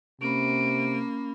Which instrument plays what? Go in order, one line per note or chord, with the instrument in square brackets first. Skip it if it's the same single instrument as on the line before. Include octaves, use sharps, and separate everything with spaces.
[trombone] C3 [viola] A#3 [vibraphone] C#4 B5 [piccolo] D7